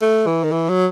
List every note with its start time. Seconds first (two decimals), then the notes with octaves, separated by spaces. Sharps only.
0.01 A3
0.26 E3
0.43 D#3
0.52 E3
0.69 F#3